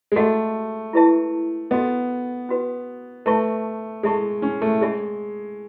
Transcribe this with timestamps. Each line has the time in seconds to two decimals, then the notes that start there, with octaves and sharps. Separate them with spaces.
0.12 G#3
0.16 A3 C#4 F#4 A4 D#5 F#5
0.93 E4 G#4 B4 E5 A5
1.71 B3 F#4 A4 D#5
2.49 C#4 F#4 B4
3.26 A3 B4 E5 A5 C#6
4.03 G#3 A4 E5 A5 C#6
4.42 C#4
4.62 A3
4.81 G#3 C#4 G#4 C#5 E5 G#5